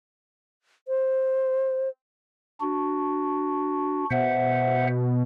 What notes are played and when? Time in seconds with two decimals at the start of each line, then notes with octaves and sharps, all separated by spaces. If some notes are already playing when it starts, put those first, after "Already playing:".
0.88 C5
2.61 D4 F#4
4.11 B2 C5 E5 F#5